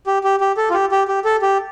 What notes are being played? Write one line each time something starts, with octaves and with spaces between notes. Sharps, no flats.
G4
G4
G4
A4
F4
G4
G4
G4
A4
G4